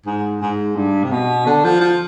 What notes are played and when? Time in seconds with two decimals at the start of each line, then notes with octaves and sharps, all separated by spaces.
0.06 G#2
0.42 G#2
0.76 G2
1.04 C3
1.11 B2
1.46 D3
1.64 F3
1.80 F3